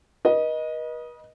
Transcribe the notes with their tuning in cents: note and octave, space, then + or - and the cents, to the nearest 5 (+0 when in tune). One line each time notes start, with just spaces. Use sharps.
B4 -40 D#5 +0